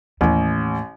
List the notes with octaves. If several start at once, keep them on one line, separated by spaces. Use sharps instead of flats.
A1 D#2 A2